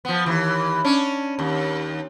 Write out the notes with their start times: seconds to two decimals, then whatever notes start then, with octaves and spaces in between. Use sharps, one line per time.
0.05 F3 B3
0.26 D#2 E3
0.85 C#4 D4
1.39 D#2